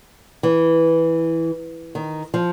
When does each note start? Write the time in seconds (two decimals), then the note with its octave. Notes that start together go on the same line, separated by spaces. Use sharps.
0.43 E3
1.95 D#3
2.34 F3